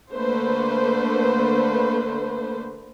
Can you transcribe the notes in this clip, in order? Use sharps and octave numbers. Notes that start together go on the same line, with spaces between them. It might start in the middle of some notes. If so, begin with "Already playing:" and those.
D3 A3 A#3 B4 C5